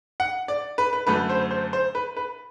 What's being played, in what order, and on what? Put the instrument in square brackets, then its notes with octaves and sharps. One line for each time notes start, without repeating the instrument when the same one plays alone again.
[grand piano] F#5
D5
B4
B4
F#2 D3 A3 B4
C5
C5
C5
B4
B4